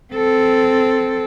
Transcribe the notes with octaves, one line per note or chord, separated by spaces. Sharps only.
C4 A4